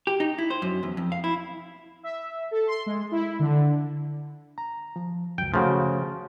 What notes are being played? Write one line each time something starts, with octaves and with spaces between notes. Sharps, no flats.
G4
D#4
E4
C5
F#2
E2
F2
F5
E4
E5
A4
C6
G#3
E4
D3
A#5
F3
C#2 F#2 G5
C#3 F3 A3 F#4